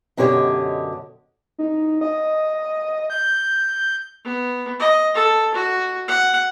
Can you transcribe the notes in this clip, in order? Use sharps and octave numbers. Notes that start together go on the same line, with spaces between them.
F#2 B2 D3 G4 C#5 D#5
D#4
D#5
G6
B3
D#5
A4
F#4
F#5